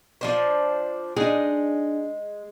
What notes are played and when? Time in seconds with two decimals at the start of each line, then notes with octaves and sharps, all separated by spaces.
0.21 F3 D4 C5
1.16 G#3 D4 D#4 G#4